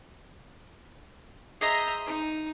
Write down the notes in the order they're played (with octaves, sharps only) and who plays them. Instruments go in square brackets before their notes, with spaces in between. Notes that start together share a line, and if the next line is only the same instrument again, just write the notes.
[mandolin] G#4 C5 D#5 [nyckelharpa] E5 A#5
[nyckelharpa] D#4